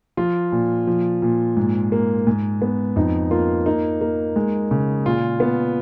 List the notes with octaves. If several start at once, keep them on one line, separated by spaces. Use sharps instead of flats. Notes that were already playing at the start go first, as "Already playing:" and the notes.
F3 F4
A#2
F3
A#2
G#2
A#3
G#2
B3
F2 D#4
A#3 F4
A#3 D#4
A#3
G#3
C#3
A#2 F4
B3